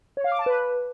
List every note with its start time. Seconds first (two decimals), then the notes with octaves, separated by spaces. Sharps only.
0.17 C#5
0.24 F5
0.32 D6
0.39 A5
0.46 B4